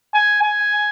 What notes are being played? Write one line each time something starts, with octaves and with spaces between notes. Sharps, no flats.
G#5
G#5